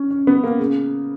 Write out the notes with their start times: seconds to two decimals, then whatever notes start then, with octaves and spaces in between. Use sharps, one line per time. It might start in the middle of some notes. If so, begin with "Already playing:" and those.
Already playing: C#4
0.10 C#4
0.27 B3
0.44 A#3
0.59 C#3